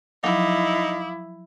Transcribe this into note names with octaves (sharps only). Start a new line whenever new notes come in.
F3 F#3 D#4 E4 F5 D6 D#6